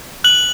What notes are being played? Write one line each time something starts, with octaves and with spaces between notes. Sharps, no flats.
F#6 F#7